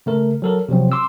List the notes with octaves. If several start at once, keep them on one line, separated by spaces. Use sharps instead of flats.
C#3 A3 A#4
F#3 A4 A#4
C3 F3 F#3 C4
C6 D6 E6